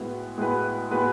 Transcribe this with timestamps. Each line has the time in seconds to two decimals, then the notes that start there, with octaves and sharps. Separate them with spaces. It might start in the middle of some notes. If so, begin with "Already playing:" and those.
Already playing: A2 G#3 B3 F#4 B4
0.37 A2 G#3 B3 F#4 B4
0.90 A2 G#3 B3 F#4 B4